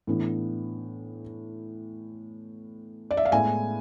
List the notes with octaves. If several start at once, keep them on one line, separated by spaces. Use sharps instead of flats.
A2 E3 B3 D4
D5
E5
F5
A2 G#3 B3 E4 G#5